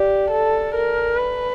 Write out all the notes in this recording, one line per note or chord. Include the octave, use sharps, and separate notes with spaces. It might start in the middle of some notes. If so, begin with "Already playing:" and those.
Already playing: G4 D5
A4
A#4
B4